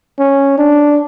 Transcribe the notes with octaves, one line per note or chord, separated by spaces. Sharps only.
C#4
D4